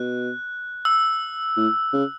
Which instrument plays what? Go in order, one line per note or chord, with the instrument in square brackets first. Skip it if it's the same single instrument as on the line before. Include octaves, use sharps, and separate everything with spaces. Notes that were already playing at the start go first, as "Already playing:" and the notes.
Already playing: [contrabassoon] B2 [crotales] F#6
[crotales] E6
[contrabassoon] A2
C#3